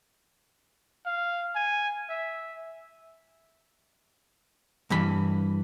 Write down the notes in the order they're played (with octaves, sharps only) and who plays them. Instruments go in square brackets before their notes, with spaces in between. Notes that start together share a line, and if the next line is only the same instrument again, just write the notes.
[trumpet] F5
G#5
E5
[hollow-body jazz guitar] G2 E3 B5